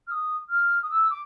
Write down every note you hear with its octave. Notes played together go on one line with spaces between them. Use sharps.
F6
D#6
F6
D#6
E6
D6